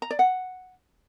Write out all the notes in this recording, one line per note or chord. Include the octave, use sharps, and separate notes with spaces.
A#5
D5
F#5